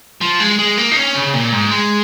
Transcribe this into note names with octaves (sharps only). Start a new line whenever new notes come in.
F3
G#3
G#3
A#3
D#4
C#4
C#3
A#2
G#2
G#3